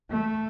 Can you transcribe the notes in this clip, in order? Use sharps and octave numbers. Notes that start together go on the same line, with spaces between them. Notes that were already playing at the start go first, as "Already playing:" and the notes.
A3